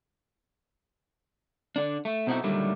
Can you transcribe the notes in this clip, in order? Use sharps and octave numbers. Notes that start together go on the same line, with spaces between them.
D3 D4
A3
B2 C4 D#4 E4 F#4 A4
A#2 D3 D#3 F#3 G3 A3